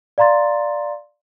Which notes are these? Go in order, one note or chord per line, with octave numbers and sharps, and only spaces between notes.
D5 F5 A#5 C6 A6